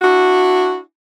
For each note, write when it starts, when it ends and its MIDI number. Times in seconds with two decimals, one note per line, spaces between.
0.02 0.79 62
0.02 0.79 64
0.02 0.79 66